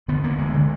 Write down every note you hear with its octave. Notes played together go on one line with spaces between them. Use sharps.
D3 B3
D2 A#3
D2 G#3
D3